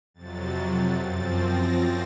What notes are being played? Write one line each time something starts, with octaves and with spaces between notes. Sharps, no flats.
F2 C3 F#3 A6
F#2 F3 C4 A6
A#6